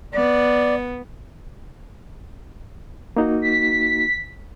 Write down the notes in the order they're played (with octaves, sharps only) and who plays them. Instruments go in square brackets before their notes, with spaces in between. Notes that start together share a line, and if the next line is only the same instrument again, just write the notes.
[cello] B3 [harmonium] D5
[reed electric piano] A#3 D#4 F#4
[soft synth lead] B6